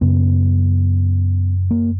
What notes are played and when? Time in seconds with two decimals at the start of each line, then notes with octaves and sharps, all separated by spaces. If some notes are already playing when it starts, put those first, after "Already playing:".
0.01 F#2 C#3 B3
1.71 A#3